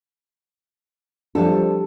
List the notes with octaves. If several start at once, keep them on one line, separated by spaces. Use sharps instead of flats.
F3 G3 D4 A4